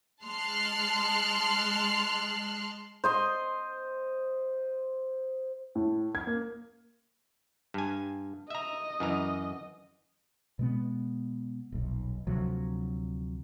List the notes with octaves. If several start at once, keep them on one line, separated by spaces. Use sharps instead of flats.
G#3 A5 C6 F6 F#6 C7
C5 D#5 C6
A2
G#6
A#3
G2 G#5
D#5 E5 A#5
F#2 E3 A#5
B2 G#3 B3
D#1 B1
D2 C3 F3 F#3